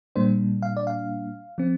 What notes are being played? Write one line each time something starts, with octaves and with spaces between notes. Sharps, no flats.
A#2 G3 A#3 D4 C5
F5
D5
F5
F3 C4